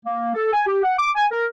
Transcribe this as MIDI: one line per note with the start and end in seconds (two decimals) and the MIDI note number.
0.05 0.33 58
0.35 0.49 69
0.53 0.63 80
0.66 0.83 67
0.83 0.95 78
0.98 1.09 86
1.16 1.25 80
1.31 1.45 70